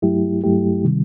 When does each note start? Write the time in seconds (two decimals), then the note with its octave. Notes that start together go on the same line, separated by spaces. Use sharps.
0.02 G2 F#3 A3 E4 G4
0.44 G2 F#3 A3 E4 G4
0.85 C3 D#3 G3